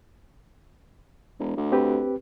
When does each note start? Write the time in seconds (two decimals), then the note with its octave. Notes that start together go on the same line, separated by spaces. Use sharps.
1.39 E1
1.57 D2
1.72 C4 G4 B4